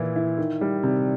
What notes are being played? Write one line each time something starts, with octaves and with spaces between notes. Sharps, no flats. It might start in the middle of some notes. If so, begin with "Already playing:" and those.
Already playing: A#2 E3 E4
E4
D#3
G3
C3